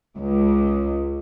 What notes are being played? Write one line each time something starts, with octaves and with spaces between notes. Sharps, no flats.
C#2